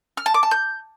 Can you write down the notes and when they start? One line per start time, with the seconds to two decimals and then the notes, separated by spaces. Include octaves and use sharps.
0.17 F6
0.26 A5
0.34 D6
0.43 A5
0.51 G6